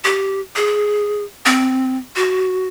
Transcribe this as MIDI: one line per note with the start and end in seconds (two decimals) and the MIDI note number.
0.04 0.41 67
0.56 1.24 68
1.46 1.98 60
2.16 2.68 66